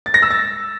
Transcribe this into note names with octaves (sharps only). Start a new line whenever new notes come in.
A6
A#6
E6
A6